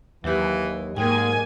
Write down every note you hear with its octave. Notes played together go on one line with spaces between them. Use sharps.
D#2 E3 F#3 G4
G#2 G#3 A#3 G5 G#5